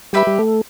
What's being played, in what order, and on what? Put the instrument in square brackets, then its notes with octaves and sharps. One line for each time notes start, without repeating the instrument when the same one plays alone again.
[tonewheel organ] G3 [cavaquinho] G4 B4 E5 B5
[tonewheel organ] G3
A3